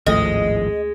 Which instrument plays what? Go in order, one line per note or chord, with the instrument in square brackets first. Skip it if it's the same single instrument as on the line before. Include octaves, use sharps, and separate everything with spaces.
[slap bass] G#1 A2 F3 [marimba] D2 A3 A4 [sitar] G#3 [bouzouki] D#5